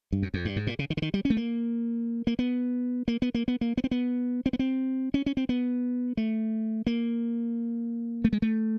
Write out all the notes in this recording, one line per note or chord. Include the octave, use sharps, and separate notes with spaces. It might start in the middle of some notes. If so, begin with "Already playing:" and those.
G2
F#2
F2
G2
G#2
A#2
C#3
D#3
D3
D#3
G3
C#4
A3
A#3
A#3
B3
A#3
B3
A#3
B3
A#3
B3
C4
B3
C4
B3
C4
C#4
C#4
C4
B3
A3
A#3
A3
G#3
A3